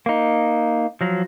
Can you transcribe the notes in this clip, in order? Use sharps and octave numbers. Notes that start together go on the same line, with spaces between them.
A#3 D#4
F3 F#3